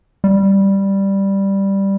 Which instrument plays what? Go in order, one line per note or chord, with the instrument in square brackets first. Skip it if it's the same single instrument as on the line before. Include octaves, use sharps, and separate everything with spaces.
[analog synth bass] G3